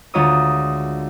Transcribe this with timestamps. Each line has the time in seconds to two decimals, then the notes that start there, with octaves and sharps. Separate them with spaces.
0.14 D2 G#3 F4 C#5 A#5 D#6